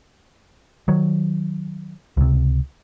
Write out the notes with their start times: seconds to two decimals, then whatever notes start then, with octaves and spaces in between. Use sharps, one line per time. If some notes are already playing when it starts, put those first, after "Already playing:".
0.88 D#3 F#3
2.17 C#2 C3